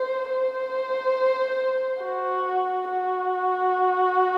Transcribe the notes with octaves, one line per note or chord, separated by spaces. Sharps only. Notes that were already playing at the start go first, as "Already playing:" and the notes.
Already playing: C5
C5
F#4
F#4